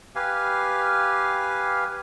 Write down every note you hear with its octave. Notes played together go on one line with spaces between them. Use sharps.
G4 B4 F5 G#5